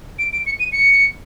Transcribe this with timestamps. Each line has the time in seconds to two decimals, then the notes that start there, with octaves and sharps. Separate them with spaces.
0.19 D7
0.33 D7
0.46 C#7
0.59 D#7
0.72 C#7